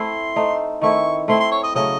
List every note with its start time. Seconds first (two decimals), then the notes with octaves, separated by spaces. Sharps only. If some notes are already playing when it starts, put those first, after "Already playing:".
Already playing: A3 C4 E4 C6
0.36 A3 D#4 A4 C5
0.82 D#3 A3 C4 E4 C#6
1.28 A3 C4 E4 C6
1.40 C6
1.51 C#5
1.64 D#5
1.75 C#3 F#3 A3 C#4 D#5